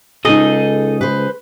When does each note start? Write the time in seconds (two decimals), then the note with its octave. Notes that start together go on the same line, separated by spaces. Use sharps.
0.25 C#2 D#4 G#4 A4 D#5
1.01 B4 C5